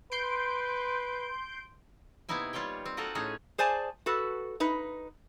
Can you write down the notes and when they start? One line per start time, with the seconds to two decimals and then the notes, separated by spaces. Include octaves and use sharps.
0.12 B4 C6 G6 D7
2.29 C3 A#3 B3 D#4 E4 G#5
2.53 G3 F4 G4 C#5 G5
2.86 C4
2.97 F4 F#4 A4 A#4 D#5 F#5
3.15 A2 C#4 D#4 G#4 C#5
3.58 G#4 C5 D5 G#5 A5
4.06 F#4 A4 B4
4.60 D#4 B4